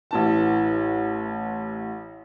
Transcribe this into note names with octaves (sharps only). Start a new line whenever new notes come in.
A1 E3 A5